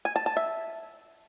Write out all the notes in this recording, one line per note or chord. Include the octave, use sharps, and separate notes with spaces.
G#5
A5
A5
E5